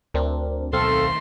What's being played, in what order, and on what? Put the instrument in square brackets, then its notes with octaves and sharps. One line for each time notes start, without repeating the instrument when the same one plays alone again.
[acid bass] D2 [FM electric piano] C4 D4 A#4
[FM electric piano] B1 C4 F5 [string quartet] D#3 A3 C6 [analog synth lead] A4